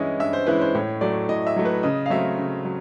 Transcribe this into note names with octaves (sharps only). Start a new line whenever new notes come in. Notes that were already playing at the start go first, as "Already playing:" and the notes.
Already playing: G2 E3 G#3 C#4 E4 D#5
G2 E5
C5
E3 G#3 C#4 E4 B4
C5
A2 C#5
F#3 A3 D5
A2 D#5
E5
F#3 A3
B4
C#3 D#5
F5
F#3 A3 C4 E5
C#3
F#3